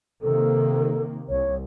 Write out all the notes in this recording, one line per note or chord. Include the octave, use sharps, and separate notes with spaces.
C3 D#3 A#3 A4
C2 C#5